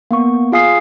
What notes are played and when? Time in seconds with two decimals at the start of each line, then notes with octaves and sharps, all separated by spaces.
0.11 A#3 B3 C#6
0.52 F4 G#4 F5 G#5 D#6 C7